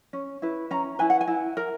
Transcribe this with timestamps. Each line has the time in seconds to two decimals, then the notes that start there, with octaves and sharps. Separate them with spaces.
0.13 C#4
0.42 E4 B4
0.71 C#4 A#5
0.99 E4 B4 G#5
1.10 F#5
1.21 G#5
1.28 E4
1.57 A#4